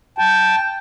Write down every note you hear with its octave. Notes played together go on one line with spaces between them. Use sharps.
G5 A5